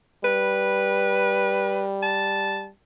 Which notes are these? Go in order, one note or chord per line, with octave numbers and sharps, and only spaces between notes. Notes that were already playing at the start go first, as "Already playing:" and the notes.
G3 B4
A5